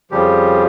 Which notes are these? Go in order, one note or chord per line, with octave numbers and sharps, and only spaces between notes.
F2 C#3 F3 G3 G4